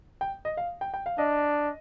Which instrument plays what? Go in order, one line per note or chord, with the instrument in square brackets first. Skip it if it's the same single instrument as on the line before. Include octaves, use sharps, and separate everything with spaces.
[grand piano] G5
D#5
F5
G5
G5
F5
[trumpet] D4 [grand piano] D#5